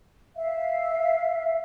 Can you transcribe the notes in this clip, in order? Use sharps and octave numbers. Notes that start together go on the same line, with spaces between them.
E5 F5